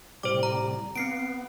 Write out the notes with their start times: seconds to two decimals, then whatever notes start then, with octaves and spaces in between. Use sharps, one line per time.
0.23 A2 C3 G3 C5 D6
0.43 A#5
0.96 B3 C4 C7 D7